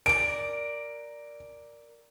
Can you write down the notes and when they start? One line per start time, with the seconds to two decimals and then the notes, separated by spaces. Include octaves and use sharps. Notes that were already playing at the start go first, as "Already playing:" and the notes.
0.06 A#4 D5 D7